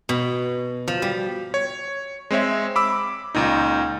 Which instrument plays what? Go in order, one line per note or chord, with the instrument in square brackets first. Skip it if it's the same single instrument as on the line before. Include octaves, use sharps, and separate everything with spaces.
[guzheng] B2
F3
G3
[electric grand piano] C#5
G#3 C4 C#5 E5
B5 D6 E6
C#2 A#2 D#4